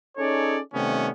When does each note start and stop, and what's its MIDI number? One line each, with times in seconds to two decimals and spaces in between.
0.18 0.59 61
0.18 0.59 63
0.18 0.59 68
0.18 0.59 69
0.18 0.59 73
0.18 0.59 74
0.74 1.10 48
0.74 1.10 51
0.74 1.10 55
0.74 1.10 57
0.74 1.10 59
0.74 1.10 61